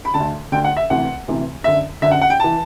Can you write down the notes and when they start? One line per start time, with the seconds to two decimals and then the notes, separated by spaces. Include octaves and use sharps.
0.05 B5
0.14 D3 A5
0.19 D2
0.52 D2 D3 G5
0.64 F#5
0.77 E5
0.90 D2 C3 E3 F#5
1.28 D2 C3 E3
1.64 F#2 D3 E5
2.02 F#2 D3 E5
2.11 F#5
2.21 F#5
2.30 G5
2.40 E3 A5